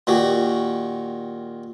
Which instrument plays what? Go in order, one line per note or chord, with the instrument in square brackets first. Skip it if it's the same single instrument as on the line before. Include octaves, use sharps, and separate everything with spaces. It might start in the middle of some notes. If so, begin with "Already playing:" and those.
[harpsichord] A#2 D#3 F#4 G4